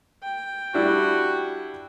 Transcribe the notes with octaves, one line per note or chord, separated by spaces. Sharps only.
G5
G3 D4 E4 F#4